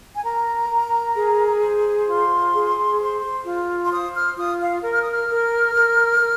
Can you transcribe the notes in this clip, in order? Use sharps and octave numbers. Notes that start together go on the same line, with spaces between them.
G#5
A#4 A#5
A#4
G#4
C5
F4 C6
G#4
C5
F4
C6
C5 D#6
F6
F4 D#6
F5
A#4
F6
D#6
F6
A#4
A#4
A#4